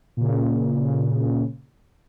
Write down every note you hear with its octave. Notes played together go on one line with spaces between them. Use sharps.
A#2 C#3